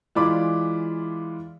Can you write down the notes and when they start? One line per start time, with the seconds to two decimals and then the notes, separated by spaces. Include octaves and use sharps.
0.15 E3 G#3 F4 D5 B5 D6